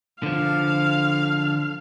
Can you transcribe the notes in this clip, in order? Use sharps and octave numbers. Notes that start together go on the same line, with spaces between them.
D3 F3 F5